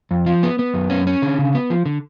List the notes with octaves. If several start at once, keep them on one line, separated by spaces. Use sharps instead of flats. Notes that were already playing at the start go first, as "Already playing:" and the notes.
F2
F3
B3
B3
F#2
C#4
C#4
D3
C#3
B3
F3
D3